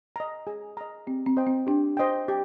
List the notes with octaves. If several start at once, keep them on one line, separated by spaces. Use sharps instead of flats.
D#5 A#5
G#4
D#5 A#5
C4 G4
C4
C5 D#5 G5
C4
D4 G4
C5 D#5 G5
G4